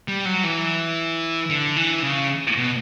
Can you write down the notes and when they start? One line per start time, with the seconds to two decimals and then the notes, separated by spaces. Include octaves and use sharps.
0.08 G3
0.25 F#3
0.43 E3
1.50 D3
1.76 E3
2.03 C#3
2.57 B2